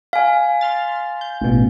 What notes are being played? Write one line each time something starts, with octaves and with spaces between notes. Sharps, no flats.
F5 G#5
C6 F6 A6
G6
A1 B2